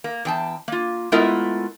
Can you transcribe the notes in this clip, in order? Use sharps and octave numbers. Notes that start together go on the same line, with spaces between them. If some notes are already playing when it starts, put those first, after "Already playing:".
A#3
E2 G5 A5
A#3 F4
G#3 A3 B3 E4 F4 A#4